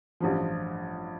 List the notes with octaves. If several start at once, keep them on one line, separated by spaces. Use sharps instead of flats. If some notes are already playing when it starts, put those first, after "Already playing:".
A1 G2 F3